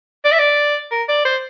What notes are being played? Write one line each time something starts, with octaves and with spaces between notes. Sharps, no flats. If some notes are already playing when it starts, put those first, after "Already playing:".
D5
E5
D5
A#4
D5
C5